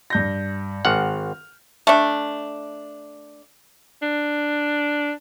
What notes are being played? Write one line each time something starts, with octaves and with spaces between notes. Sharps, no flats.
G2 G6 A#6
G#1 F#5 F6
A3 D4
D4